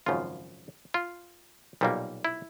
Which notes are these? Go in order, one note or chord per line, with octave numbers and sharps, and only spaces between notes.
G#1 F#2 C#3 F3 F4
F4
B1 A#2 G3 A#3
E4